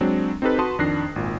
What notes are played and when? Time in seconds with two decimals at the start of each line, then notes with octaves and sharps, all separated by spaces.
0.01 F#3 G#3 C4 D4
0.42 C4 D#4 G4 A4 B4
0.59 F#4 B4 A5 C6 D#6
0.79 F2 D#3 D4 F#6 A#6 C7
1.16 G#1 A#2